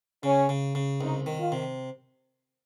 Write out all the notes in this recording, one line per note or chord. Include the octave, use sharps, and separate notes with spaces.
C#3 C#4
C#3
C#3
C2 D#4
D#3
F4
C3